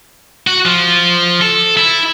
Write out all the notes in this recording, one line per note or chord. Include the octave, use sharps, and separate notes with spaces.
F#4
F3
A4
E4